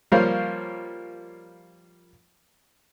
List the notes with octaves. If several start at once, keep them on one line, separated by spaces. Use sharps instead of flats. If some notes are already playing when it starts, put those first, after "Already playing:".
F3 G3 A#3 C5 C#5 F5